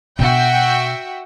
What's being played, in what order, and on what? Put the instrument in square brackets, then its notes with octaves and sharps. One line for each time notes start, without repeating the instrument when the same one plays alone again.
[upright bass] B2 D4 [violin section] F#4 E5 G5